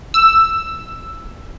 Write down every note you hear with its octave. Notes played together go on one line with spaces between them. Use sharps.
E6